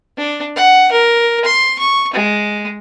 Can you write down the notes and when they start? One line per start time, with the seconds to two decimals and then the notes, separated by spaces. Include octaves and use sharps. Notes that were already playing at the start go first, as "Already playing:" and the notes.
0.17 D4
0.56 F#5
0.92 A#4
1.45 C6
1.79 C#6
2.13 G#3